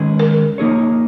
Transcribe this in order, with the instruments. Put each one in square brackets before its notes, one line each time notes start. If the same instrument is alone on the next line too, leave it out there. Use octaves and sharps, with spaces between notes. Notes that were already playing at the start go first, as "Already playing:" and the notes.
Already playing: [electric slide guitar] D#3 G#3 C#4 G#4 B4
[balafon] A#4
[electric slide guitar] F3 A#3 D#4 G#4 C#5